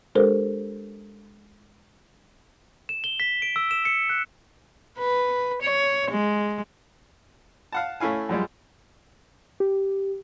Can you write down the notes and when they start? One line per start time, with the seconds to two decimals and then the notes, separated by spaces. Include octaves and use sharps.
0.15 G#3 D4 G4 A4 A#4 C5
2.89 E7
3.04 G7
3.20 B6
3.42 D7
3.56 E6
3.71 E7
3.85 C#7
4.10 F#6
4.99 B4
5.62 C#5
6.11 G#3
7.72 F5 F#5 A5
8.00 A3 C#4 E4 F5 G#5
8.29 F#2 F3 G3 G#3
9.60 G4